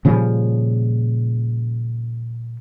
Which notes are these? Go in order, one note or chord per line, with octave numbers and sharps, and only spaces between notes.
A#2 C#3 F3 G3